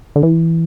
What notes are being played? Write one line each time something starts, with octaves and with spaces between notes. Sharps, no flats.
D3
E3